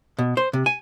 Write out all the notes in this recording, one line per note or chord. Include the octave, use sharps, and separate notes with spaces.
B2
C5
C3
G#5